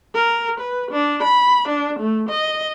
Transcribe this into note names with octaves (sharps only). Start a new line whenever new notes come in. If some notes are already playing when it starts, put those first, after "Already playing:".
A#4
B4
D4
B5
D4
A3
D#5